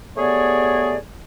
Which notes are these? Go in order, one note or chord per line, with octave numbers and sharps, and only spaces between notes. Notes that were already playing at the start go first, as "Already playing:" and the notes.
A3 B3 G4 G#4 C#5 D5